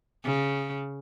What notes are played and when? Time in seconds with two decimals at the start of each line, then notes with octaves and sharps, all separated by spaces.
0.24 C#3